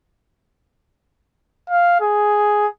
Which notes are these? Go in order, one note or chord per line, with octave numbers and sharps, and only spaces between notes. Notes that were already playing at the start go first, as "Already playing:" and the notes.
F5
G#4